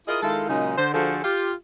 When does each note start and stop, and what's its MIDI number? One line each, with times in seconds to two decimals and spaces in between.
0.08 0.21 64
0.08 0.21 65
0.08 0.21 68
0.08 0.21 70
0.08 0.21 75
0.22 0.46 51
0.22 0.46 56
0.22 0.46 64
0.22 0.46 65
0.22 0.46 69
0.49 0.75 46
0.49 0.75 49
0.49 0.75 54
0.49 0.75 56
0.49 0.75 63
0.77 0.90 50
0.77 0.90 72
0.94 1.19 50
0.94 1.19 53
0.94 1.19 66
0.94 1.19 68
0.94 1.19 69
0.94 1.19 72
1.24 1.52 65
1.24 1.52 67